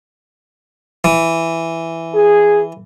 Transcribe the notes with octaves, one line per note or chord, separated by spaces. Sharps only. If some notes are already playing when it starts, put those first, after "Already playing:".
E3
G#4